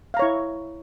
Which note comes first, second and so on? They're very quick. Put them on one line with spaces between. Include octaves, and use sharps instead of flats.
F5 A#5 C#5 E4